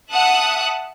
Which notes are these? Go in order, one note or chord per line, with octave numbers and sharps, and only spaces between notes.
E5 F#5 A5 D#6 F#6